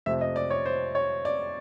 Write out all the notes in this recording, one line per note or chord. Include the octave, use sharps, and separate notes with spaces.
F2 C3 F3 A3 E5
D#5
D5
C#5
C5
C#5
D5